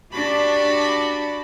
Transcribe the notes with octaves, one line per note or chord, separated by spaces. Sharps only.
D4 F#4 G4 D5 A5 B5